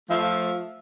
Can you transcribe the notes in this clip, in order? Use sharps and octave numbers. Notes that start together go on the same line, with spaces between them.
F3 A3 E5 F5